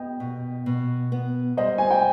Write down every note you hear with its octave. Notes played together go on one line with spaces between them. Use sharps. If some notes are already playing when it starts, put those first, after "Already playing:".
Already playing: B3 D#5 G5
B2
B2
B3
G3 C5 D#5
G#5
G5